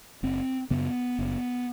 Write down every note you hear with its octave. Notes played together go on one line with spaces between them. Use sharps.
F#1 C4
F#2 C#3 B3
F#1